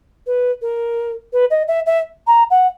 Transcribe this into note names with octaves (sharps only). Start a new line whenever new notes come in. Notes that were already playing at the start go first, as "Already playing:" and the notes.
B4
A#4
B4
D#5
E5
E5
A#5
F#5